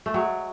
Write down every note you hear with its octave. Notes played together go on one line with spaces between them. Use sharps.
A3
F#3 G#3